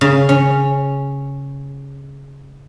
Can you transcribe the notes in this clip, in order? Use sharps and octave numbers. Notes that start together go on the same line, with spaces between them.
C#3
C#4